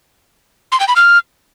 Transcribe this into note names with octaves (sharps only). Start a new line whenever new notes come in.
C6
G5
B5
F6